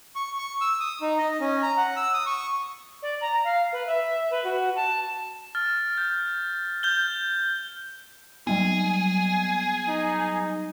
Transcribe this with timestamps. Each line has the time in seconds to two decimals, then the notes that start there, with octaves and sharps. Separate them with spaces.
0.15 C#6
0.39 C#6
0.61 E6
0.80 D#6
1.01 D#4
1.19 D#5
1.40 C#4
1.62 A#5
1.77 F#5
1.96 E6
2.14 D#6
2.26 C#6
3.02 D5
3.21 A#5
3.44 F5
3.72 B4
3.87 E5
4.31 B4
4.44 F#4
4.76 A5
5.55 F6 A6
5.98 G6
6.83 F6 G6 G7
8.47 F#3 G3 B3 G#4
9.88 D#4